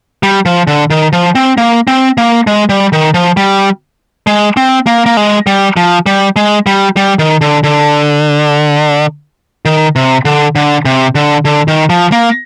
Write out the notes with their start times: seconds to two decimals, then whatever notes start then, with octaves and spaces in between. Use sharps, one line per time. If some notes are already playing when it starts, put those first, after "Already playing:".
0.23 G3
0.46 F3
0.67 D3
0.90 D#3
1.13 F3
1.35 C4
1.58 A#3
1.88 C4
2.18 A#3
2.47 G#3
2.69 G3
2.93 D#3
3.14 F3
3.37 G3
4.27 G#3
4.57 C4
4.87 A#3
5.06 A#3
5.17 G#3
5.47 G3
5.77 F3
6.06 G3
6.36 G#3
6.67 G3
6.97 G3
7.19 D#3
7.41 D3
7.64 D3
9.65 D#3
9.96 C3
10.25 D3
10.55 D3
10.85 C3
11.15 D3
11.45 D3
11.68 D#3
11.90 F3
12.12 A#3